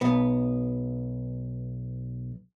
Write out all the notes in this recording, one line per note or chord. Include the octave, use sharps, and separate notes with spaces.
B1 B3